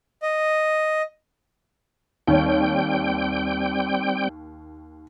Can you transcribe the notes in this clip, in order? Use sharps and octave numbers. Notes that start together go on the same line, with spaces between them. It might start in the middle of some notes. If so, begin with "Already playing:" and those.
D#5
D#2 G3 C4 C#5 G5